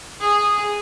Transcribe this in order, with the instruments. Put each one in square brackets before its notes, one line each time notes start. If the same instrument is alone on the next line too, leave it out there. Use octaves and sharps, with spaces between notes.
[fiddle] G#4